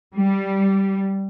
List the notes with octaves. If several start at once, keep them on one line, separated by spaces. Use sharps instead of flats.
G3